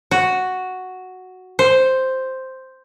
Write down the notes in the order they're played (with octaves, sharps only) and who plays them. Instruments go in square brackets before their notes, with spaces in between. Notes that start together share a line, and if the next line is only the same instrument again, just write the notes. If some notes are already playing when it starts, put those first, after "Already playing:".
[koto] F#4
C5